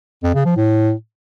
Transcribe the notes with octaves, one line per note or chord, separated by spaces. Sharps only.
F2
C#3
F3
A2